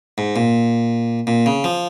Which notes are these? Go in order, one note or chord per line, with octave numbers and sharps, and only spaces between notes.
G#2
A#2
A#2
C#3
F3